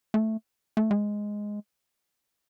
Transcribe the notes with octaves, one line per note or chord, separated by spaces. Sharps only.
A3
A3
G#3